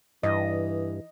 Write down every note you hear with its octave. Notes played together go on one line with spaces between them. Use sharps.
G2 E3 D#5